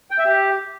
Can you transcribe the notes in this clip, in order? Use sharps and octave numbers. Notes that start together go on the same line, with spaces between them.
G5
E5
G4